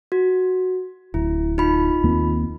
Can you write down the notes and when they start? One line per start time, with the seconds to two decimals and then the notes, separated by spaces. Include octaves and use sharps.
0.12 F#4
1.14 D1 E4
1.58 D#4 F4 B5
2.03 D#2 A#3 C4